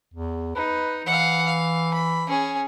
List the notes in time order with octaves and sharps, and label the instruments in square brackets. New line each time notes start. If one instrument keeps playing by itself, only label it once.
[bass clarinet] E2
[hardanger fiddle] D#4 [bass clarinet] B4
[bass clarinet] E3 [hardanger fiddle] F5 F#5
[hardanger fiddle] F5
B5
C#4 G#4